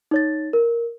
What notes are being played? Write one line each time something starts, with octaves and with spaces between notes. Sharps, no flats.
D#4 C#5 A6
A#4